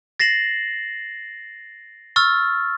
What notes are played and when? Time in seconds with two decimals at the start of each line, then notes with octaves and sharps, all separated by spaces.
0.20 A6 A#6 C7 E7 F#7
2.16 C#6 E6 F6 A6